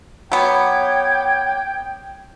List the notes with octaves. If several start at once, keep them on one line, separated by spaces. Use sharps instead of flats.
F#3 B3 C#5 G5 D6 G#6